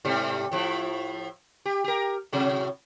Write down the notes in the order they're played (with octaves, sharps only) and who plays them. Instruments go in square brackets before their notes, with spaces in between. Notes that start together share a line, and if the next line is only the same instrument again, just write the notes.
[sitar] G#2 C3 G3
A2 F3 E4
G4
G4 A#4
A2 C3 F#3